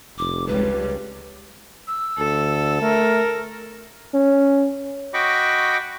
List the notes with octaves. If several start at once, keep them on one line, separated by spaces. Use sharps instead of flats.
F1 D6
C#2 G3 B4
E6
D2 A4
A3 A#4
C#4
F#4 D#5 G5 B5 C#6 D6